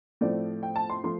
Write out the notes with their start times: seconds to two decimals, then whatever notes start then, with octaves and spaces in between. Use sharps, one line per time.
0.21 A2 F3 A3 C4 D5
0.63 G5
0.76 A5
0.90 C6
1.04 F3 A3 C6